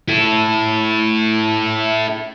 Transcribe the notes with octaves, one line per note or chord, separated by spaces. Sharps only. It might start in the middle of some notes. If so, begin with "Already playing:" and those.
E4 A4